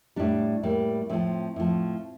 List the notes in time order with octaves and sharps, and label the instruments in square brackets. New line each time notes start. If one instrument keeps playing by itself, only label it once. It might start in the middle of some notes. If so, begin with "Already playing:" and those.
[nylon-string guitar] A2 G3 D4
A2 G3 A#3
A2 F3 C4
A2 F3